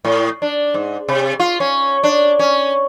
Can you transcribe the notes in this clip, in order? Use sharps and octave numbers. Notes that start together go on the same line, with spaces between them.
A2
D4
G#2
C3
F4
C#4
D4
C#4